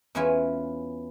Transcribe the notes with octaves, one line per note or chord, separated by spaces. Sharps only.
E2 E3 C#4 E4 F4 G#5